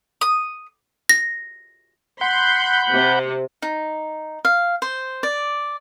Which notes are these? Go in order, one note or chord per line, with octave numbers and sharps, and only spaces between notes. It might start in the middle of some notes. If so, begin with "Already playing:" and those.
D#6
A#6
F#5 B5 C6 G6
C3
D#4
F5
C5
D5